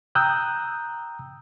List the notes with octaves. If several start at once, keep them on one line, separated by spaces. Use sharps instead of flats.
G5 A#5 D#6 E6 F#6 G6